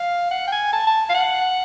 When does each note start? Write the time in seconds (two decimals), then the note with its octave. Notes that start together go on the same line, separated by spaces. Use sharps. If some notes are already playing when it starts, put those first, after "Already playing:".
Already playing: F5
0.31 F#5
0.47 G5
0.52 G#5
0.73 A5
0.87 A5
1.10 F5
1.15 F#5